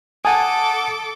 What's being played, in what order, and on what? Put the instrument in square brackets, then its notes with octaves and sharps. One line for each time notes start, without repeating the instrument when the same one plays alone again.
[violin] A4 D6 [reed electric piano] F#5 A5 D#6 [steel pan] G#5